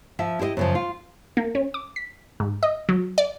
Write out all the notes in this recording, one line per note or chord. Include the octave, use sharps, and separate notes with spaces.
F3 E5
E4 G4 C5 D#5
F#2 C#3 F3
F4
A#3
C#4
D6
B6
G#2
D#5
F#3
D5